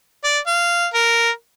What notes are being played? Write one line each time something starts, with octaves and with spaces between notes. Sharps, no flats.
D5
F5
A#4